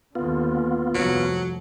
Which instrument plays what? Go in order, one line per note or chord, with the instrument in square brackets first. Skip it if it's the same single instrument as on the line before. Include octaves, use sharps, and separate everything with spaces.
[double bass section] D#2 D3 [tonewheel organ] B3 F4
[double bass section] F1 C2 F3 [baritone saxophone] F#3